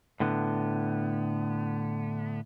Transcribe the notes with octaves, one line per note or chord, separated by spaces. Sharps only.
A2 D3 B3